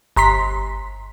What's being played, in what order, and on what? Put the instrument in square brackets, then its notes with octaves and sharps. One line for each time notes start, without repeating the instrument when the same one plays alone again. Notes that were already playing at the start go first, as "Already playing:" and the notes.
[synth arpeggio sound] G1 A#5 C6 B6